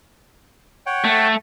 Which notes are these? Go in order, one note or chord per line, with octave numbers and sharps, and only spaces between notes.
C#5 F#5 G5
A3